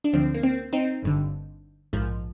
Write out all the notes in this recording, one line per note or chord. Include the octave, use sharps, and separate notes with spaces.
D4
D2 D3 F3 C4
A#3
C4
C4 D#4
G1 G2 D3
A#1 G#2 F3